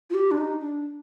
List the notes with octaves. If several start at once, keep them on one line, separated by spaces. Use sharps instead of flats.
F4
G4
D4
D#4
D4